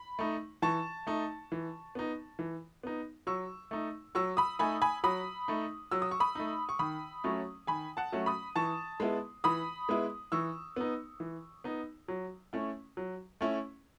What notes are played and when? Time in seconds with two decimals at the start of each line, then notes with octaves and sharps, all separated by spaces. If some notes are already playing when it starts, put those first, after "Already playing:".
Already playing: B5
0.19 A3 D#4
0.62 E3 A5 C#6
1.07 A3 D#4
1.52 E3
1.95 B3 D#4
2.39 E3
2.83 B3 D#4
3.27 F#3 C#6 E6
3.71 A3 D#4
4.15 F#3 C#6 E6
4.37 B5 D#6
4.59 A3 D#4 G#5 B5
4.82 G#5 B5
5.04 F#3 B5 D#6
5.48 A3 D#4
5.91 F#3 E6
6.02 D#6
6.11 C#6
6.20 B5 D#6
6.35 A3 D#4
6.69 C#6
6.79 D#3 B5 D#6
7.24 F#3 A3 C#4
7.67 D#3 G#5 B5
7.97 F#5 A5
8.12 F#3 A3 C#4
8.26 B5 D#6
8.56 E3 A5 C#6
9.00 G#3 B3 E4
9.44 E3 B5 D#6
9.89 G#3 B3 E4
10.32 E3 C#6 E6
10.76 B3 D#4
11.20 E3
11.64 B3 D#4
12.08 F#3
12.53 A3 C#4 E4
12.97 F#3
13.41 A3 C#4 E4